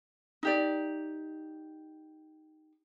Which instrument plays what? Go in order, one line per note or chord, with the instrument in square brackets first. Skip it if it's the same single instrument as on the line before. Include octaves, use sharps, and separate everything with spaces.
[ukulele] D#4 G4 D5